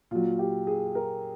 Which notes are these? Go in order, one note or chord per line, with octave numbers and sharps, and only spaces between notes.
A#2 F#3 F4
G4
G#4
A#4